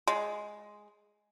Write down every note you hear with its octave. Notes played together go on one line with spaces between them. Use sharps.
G#3